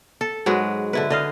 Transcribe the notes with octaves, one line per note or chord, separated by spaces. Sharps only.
A4
G#2 F#3 G#3 B4
D3 E4 B4
D3 D#5 F5